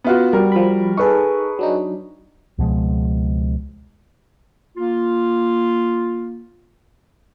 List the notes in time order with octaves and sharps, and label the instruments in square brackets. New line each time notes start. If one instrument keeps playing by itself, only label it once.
[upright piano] B3 F4 F#4
[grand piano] G3 F#4 [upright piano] A#4
[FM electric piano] F3 B5
[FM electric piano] D#4 A4 [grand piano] G#4 B4 C#6
[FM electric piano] F#3 D4 D#4
[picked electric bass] C#2 B2 F3 G#3
[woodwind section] A#3 F4